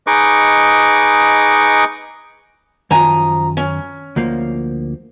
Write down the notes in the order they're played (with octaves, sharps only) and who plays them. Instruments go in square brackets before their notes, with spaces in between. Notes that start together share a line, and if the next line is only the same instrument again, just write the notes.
[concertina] D#4 G#4 B4 D#5 C#6 D6
[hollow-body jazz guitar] F#2 D#3 G#5 [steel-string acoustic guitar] F3 A#5
[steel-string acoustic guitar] C#4
[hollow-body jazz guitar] D2 F3 A#3